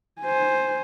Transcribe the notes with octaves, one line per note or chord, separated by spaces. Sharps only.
C5 G#5